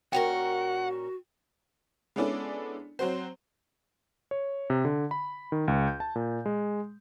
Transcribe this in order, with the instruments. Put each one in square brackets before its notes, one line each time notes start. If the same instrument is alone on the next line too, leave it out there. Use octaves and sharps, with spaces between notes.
[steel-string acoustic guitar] A#2 C#4 A#4 [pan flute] F#4 [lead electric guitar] F#5 [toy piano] G5
[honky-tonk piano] G#3 B3 C#4 D4 E4 A4
F#3 C4 F#4 C5
[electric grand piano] C#5
C3
D3
B5
D#3
C#2
G6
A5
A#2
G#3